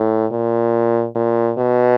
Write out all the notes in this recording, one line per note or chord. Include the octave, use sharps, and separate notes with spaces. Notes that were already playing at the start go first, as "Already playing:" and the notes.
Already playing: A2
A#2
A#2
B2